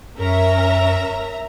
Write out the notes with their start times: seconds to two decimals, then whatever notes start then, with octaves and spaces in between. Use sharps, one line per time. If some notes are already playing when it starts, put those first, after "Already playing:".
0.19 F#2 C#4 A#4 E5 A#5